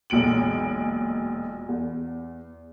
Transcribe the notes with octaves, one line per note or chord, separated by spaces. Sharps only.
E1 B1 A#2 D7 F#7
E2